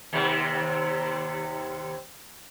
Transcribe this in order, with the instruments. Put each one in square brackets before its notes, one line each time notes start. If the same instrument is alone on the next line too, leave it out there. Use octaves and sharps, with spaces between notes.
[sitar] D#2 C3